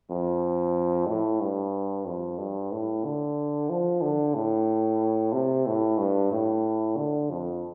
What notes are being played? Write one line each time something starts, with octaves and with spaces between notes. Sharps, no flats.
F2
A2
G2
F2
G2
A2
D3
F3
D3
A2
C3
A2
G2
A2
D3
F2